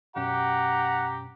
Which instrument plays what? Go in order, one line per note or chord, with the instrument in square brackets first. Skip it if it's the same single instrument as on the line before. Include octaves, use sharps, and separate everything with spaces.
[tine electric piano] F#2 B2 C#4 [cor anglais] G4 [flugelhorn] F#5 [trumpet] A#5